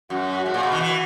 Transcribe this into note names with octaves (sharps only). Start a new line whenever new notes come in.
F#2 F#4
G#2 F#4
A#2
B2
D#3
E3